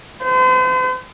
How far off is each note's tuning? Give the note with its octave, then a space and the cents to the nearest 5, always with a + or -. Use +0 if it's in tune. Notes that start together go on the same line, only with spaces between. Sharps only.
C5 -40